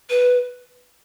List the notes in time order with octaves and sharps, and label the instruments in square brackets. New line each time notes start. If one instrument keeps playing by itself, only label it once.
[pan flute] B4